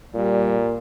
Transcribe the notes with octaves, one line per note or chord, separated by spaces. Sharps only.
A#2 G3